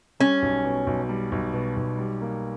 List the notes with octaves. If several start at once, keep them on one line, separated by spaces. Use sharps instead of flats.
G3 C#4
B1
B2
B1
G3
B1
B2
B1
G3
A#3